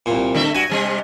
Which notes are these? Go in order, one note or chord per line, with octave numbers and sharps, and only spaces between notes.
C2 A#2
D3 A3 E5
G2 F#4 G#5
C3 G3 C4